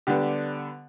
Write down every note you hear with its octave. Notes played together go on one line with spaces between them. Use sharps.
D3 G3 B3 D4 G4